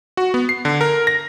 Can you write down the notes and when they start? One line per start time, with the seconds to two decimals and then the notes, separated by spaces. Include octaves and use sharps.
0.17 F#4
0.34 B3
0.49 C7
0.65 D3
0.81 A#4
1.07 A#6